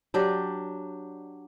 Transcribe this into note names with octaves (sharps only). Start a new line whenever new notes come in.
F#3 D4 G4 D5